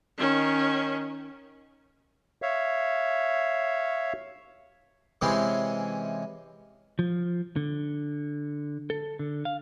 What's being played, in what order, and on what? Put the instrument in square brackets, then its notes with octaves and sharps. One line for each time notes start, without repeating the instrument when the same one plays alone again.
[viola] D#3 C#4
[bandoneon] C#5 E5 F5
[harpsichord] C3 E3 G#3 C4 C#4 E4
[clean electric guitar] F3
D3
A4
D3
F5